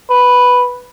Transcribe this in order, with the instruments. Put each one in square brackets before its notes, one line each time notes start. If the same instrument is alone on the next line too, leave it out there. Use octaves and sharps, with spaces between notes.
[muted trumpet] B4